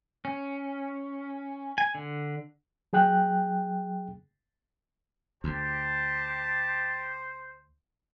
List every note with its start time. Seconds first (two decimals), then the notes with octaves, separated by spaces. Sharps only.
0.25 C#4
1.78 G#5
1.95 D3
2.93 F#3 G#4 G5 F#6
5.44 D2 G4 C5 A5